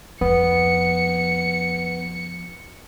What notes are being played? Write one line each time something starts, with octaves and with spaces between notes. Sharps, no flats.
F2 B3 C#7